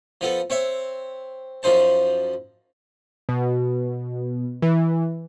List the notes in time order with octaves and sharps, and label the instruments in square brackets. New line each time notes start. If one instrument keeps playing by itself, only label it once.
[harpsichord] F3 B3 A4
C4 C#5 E5
F#2 F3 D#4 C5 A5
[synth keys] B2
E3